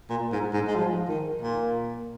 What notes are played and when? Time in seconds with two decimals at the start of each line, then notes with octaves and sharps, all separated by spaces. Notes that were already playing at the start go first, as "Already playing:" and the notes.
0.10 A#2
0.32 G#2
0.53 G#2
0.68 G#3
0.76 F3
1.08 D#3
1.41 A#2